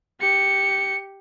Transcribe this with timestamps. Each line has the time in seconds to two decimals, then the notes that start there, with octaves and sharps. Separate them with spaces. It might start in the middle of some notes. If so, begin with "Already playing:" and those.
0.20 G4 C#7